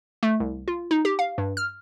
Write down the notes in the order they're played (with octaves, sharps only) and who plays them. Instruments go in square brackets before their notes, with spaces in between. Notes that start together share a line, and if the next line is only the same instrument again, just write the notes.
[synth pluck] A3
C2
F4
D#4
G4
F5
G2
F6